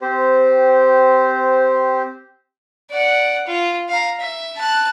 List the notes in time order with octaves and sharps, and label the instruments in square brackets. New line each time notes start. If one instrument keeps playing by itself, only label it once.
[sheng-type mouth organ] C4 G4 C5
[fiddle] D5 F#5
F4
F5 A#5
E5
A5 F#6